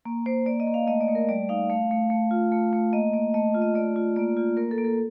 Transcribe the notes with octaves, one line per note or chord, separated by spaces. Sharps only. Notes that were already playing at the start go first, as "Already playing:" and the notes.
A#3
A#3 C5
A#3 D5
D#5
A#3
F5
A3 D#5
D5
A3
A#4
G3 D5
D#4 F5
A3 F5
A3
A3
F4
A3
A3
A#3 D#5
A#3
A3 D#5
F4
D#5
A3 D5
F4
A#3 D5
F4
A#3 A#4
A4
A#3
A4